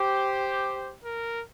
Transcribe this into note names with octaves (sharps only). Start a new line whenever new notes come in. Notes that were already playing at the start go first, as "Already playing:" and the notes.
Already playing: G4 C5
A#4